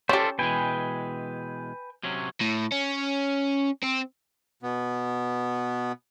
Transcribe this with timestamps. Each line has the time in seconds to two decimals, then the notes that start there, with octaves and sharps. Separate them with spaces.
0.09 C#4 F4 G4 A4 C5 D5 E5
0.39 B2 E3 G#3 B4 G5 G#5
2.03 C3 F#3 C#4
2.41 A2
2.72 C#4
3.84 C4
4.63 B2 B3